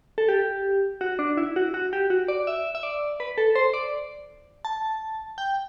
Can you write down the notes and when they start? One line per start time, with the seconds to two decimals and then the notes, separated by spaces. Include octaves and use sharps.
0.18 A4
0.29 G4
1.01 F#4
1.19 D4
1.37 E4
1.56 F#4
1.74 F#4
1.93 G4
2.10 F#4
2.28 D5
2.47 E5
2.75 E5
2.83 D5
3.20 B4
3.38 A4
3.55 C5
3.74 D5
4.65 A5
5.38 G5